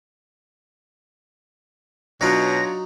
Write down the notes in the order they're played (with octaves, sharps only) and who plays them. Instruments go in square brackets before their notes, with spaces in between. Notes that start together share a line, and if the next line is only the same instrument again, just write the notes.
[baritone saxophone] B2 [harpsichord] F#3 D#4 [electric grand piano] D4 F4 C#5 [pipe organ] A#6